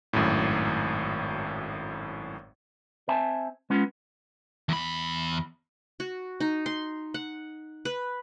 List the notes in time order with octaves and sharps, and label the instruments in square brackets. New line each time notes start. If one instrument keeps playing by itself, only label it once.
[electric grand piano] G#1 F#2 A2
[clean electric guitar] C4 E5 G#5 A5
G#3 B3 C#4 F4
[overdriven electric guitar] E2 B5
[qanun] F#4
D#4
C6
F#5
B4